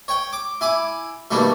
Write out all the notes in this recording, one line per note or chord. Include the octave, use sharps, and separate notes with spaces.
C#5 G5
D6
E4 G#5 D6
B2 D#3 G3 A3 A#3